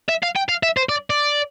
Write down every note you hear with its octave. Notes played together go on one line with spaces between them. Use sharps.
E5
F5
G5
F5
E5
C5
D5
D5